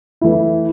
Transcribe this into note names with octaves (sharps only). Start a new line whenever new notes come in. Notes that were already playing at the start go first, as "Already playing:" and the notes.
E3 A3 E4